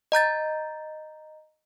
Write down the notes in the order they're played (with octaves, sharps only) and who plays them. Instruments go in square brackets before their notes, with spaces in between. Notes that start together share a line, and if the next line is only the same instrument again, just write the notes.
[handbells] D#5 A#5 G6 A6